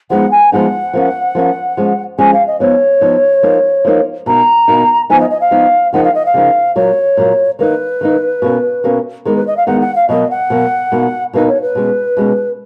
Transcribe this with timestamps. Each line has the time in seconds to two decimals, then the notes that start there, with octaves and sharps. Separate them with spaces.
0.10 F3 G#3 B3 D#4 F#5
0.31 G#5
0.52 F3 G#3 B3 D#4 F#5
0.93 F3 A#3 C#4
1.35 F3 A#3 C#4
1.77 F3 G#3 C#4
2.18 F3 G#3 C#4 G#5
2.33 F5
2.46 D#5
2.60 F3 B3 D#4 C#5
3.01 F3 B3 D#4
3.43 F3 A#3 D#4
3.85 F3 A#3 D#4
4.26 B2 A#3 D#4 A#5
4.68 B2 A#3 D#4
5.09 F3 B3 D#4 G#5
5.20 D#5
5.30 D#5
5.40 F5
5.51 F3 B3 D#4
5.93 C#3 F3 A#3 D#4 F#5
6.03 F5
6.14 D#5
6.25 F5
6.34 C#3 F3 A#3 D#4
6.75 A#2 F#3 A#3 C#5
7.17 A#2 F#3 A#3
7.59 D#3 A#3 D#4 B4
8.01 D#3 A#3 D#4
8.42 B2 A#3 C#4
8.84 B2 A#3 C#4
9.25 D#3 G#3 B3 D#4 A#4
9.35 B4
9.47 D#5
9.56 F5
9.67 D#3 G#3 B3 D#4 F#5
9.81 F#5
9.95 F5
10.08 B2 F#3 A#3 D#5
10.30 F#5
10.50 B2 F#3 A#3
10.92 B2 A#3 D#4
11.33 B2 A#3 D#4 B4
11.48 C#5
11.62 B4
11.75 B2 G#3 C#4
12.17 B2 G#3 C#4